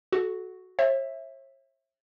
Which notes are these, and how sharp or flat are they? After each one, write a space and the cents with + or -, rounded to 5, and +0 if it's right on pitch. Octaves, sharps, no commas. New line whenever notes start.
F#4 +0 A4 -25
C#5 -45 E5 +0